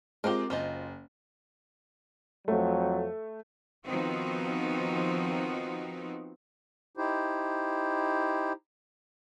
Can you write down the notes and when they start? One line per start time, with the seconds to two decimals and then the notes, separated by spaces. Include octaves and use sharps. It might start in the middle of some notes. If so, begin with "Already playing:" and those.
0.24 G#3 C4 F4 G4 A#4
0.50 F#1 F4 C5 D#5
2.48 F2 F3 F#3 A3
3.85 D#3 F3 B3 C4 D#4 F#4
6.97 D#4 E4 G4 C5